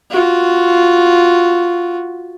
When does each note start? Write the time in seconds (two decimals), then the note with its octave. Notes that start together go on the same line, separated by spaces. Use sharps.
0.11 F4 F#4